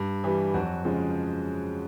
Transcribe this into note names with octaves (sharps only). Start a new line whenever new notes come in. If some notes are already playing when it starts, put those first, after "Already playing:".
Already playing: G2
E3 G3
F2 F#3 F#4
C#3 F3 G#3